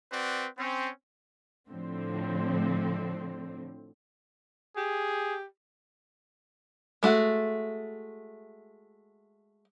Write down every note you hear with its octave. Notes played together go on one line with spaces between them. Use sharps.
C4 F#4 B4 D5
C4 C#4
A2 D3 F3 C4
G4 G#4
G#3 A3 F#4